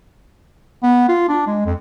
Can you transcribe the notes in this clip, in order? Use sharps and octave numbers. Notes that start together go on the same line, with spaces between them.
B3
F4
D4
G#3
F2